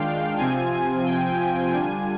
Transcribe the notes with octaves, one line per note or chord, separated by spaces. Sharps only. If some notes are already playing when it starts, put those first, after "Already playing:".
Already playing: D#3 G#3 D4 F4 F5 G5
C3 F3 C4 F4 G#5
G5
D3 G3 D4 F4 G#5